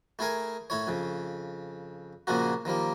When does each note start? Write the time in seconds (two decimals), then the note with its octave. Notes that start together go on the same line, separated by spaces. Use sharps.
0.19 A3 E4 G#4 A#4 G#5
0.70 A2 E4 C#5
0.87 F2 C#3
2.27 A#2 C#3 F3 G#3 A#3 F#4
2.65 D#3 F3 G3 A#3